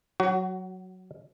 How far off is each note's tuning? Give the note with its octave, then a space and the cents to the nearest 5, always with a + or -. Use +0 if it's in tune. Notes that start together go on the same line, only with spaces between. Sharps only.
F#3 +0 F#4 +25